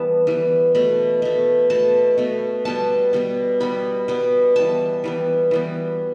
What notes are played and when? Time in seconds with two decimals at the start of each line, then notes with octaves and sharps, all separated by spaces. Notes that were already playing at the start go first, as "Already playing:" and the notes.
Already playing: E3 G3 B3 A5
0.27 E3 G3 B3
0.75 B2 A3 B5
1.22 B2 A3
1.70 B2 A3 A5
2.18 B2 A3
2.65 B2 G3 B3 A5
3.13 B2 G3 B3
3.60 B2 G3 B3 B5
4.08 B2 G3 B3
4.56 E3 G3 B3 A5
5.04 E3 G3 B3
5.51 E3 G3 B3